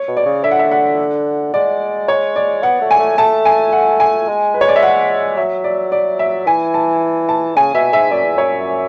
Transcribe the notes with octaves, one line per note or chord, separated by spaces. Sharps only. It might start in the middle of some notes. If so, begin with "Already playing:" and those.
Already playing: C#5
B2
D5
C#3
D3 E5
F#5
E5
F#5
G#3 D5
C#5
D5
B3 F#5
A3
G#5
A3
A3 A5
G#5
F#5
G#5
G#3
B4
C#5
D5
E5
F#5
F#3 E5
D5
D5
E5
E3 G#5
A5
A5
C#3 G#5
B2 E5
G#2 E5
F#2 D5
E2
F#2 C#5